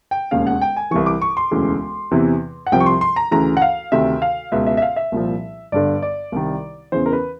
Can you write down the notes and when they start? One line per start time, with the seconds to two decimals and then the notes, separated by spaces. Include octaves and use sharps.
0.11 G5
0.31 E1 D#2 C#3 F5
0.47 F#5
0.61 G5
0.76 G#5
0.91 C2 C3 E3 C#6
1.06 D6
1.22 C#6
1.37 C6
1.51 E1 D2 C#3 E3
2.11 E2 C3 E3
2.67 F#5
2.72 C2 C3 F3 G5
2.80 C#6
2.86 C6
3.01 C6
3.16 A#5
3.31 D2 C#3 E3 A#5
3.57 F#5
3.62 F5
3.92 D2 C3 D#3 E5
4.22 F5
4.52 C#2 B2 E5
4.66 E5
4.77 E5
4.82 F5
4.96 E5
5.12 C2 A#2 F3
5.72 G1 G2 D3 D5
6.02 D5
6.32 C2 C3 D#3
6.92 E2 C#3 E3 C5
7.06 A#4
7.13 B4